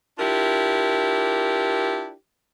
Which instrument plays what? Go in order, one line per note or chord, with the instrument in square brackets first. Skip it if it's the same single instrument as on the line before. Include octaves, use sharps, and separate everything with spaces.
[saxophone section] D4 E4 F4 G4 A#4